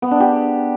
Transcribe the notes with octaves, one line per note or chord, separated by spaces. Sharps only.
B3
D4
G4